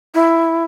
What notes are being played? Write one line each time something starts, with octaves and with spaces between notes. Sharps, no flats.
E4